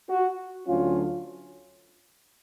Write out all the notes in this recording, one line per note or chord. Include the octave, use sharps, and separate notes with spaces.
F#4
D2 D3 F#3 C#4 F4